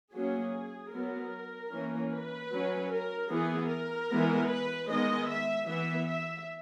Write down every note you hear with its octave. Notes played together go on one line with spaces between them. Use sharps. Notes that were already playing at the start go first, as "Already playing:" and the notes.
F#3 A#3 C#4 G#4
F#3 B3 A#4
E3 A#3 C#4
B4
F#3 C#4
A#4
E3 B3 G#4
A#4
E3 G#3 B3
B4
D#3 G#3 B3 D#5
E5
E3 B3 E5
E5